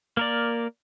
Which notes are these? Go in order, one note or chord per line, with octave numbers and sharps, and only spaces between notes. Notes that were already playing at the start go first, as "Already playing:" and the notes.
A#3 A#4 D5